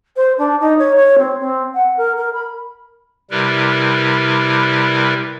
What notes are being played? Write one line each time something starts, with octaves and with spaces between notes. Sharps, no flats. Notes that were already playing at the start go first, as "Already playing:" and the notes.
C5
D4
D#4
C#5
C#5
C4
C4
F#5
A#4
A#4
B5
C3 G3 E4 A#4 B4